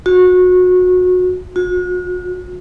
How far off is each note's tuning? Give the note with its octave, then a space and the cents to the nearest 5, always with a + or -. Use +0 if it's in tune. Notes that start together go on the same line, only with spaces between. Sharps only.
F#4 -25
F#4 -45